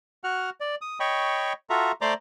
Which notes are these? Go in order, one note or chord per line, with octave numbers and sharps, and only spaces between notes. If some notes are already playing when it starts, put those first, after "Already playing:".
F#4 F#5 F6
D5
D#6
C#5 D#5 G5 B5 C#6
F4 F#4 A4 E5 A#5
A3 C5 D5 A#5 C6 D6